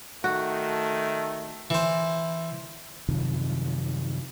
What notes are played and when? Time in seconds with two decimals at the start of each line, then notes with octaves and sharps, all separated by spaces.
0.24 D#3 A3 F#4
1.70 E3 C5
3.09 F#2 C3 D#3 F3